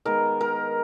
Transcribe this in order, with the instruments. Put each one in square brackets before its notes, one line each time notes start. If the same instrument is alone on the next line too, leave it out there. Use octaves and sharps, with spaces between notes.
[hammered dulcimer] D#3 G#3 B3 A#4
A#4